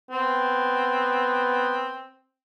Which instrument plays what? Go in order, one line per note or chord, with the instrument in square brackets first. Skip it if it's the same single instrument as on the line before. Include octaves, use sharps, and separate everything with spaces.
[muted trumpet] B3 [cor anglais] C4